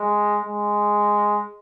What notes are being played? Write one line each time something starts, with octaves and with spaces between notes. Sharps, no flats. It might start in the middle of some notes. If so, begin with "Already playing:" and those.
Already playing: G#3
G#3